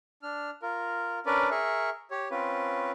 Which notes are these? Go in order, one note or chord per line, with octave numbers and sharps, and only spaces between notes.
D4 F6
F4 A#4
C#4 D4 A#4 B4 D5
G#4 A#4 E5 C#6
G4 C#5
C4 C#4 F4 B4